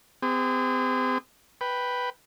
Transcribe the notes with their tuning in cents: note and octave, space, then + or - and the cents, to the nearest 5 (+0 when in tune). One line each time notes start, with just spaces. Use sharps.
C4 -40 G#4 -40
B4 +0 G5 +0